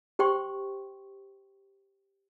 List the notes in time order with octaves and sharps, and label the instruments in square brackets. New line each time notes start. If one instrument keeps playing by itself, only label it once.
[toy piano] G4 C5 G5 C6 C#6